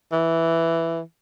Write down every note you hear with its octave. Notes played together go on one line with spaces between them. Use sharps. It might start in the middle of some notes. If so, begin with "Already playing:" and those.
E3